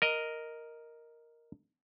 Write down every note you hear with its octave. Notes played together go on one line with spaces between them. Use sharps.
A#4 D#5